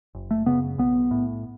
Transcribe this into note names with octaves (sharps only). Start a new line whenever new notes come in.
F#1
A3
F#2 C#3 B3
B1 B3
A2